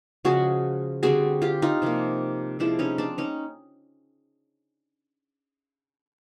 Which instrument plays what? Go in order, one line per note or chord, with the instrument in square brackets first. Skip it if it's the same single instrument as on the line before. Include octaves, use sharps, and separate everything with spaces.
[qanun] C#3 F3 G#3 F#4 G#4
D3 G3 C4 F#4 G#4
F4 G4
D#4 F4
C3 F3 A#3
C3 F3 G#3 C4 D4 E4
C#4 D#4
C4 D4
C#4 D#4